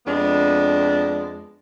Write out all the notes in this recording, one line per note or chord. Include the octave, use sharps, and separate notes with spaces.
F2 G#3 B3 D4